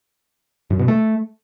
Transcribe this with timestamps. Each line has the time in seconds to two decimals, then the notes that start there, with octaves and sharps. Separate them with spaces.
0.70 F#2
0.79 B2
0.88 A3